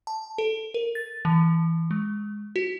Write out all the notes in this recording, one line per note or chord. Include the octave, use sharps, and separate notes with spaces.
A5
A4
A#4
A6
E3
G#3
F#4